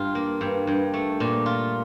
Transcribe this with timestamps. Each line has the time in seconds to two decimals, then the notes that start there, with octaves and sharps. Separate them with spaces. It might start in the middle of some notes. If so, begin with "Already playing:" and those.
Already playing: G2 F4
0.15 A#3
0.41 G2
0.67 G2
0.94 A3
1.20 A#2
1.46 F4